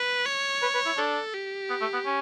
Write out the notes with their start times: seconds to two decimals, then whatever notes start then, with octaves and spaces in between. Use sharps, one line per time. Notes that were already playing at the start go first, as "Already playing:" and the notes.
Already playing: B4
0.26 C#5
0.62 B4
0.74 B4
0.85 E4
0.97 D4 A4
1.34 G4
1.69 B3
1.81 A3
1.93 B3
2.05 C#4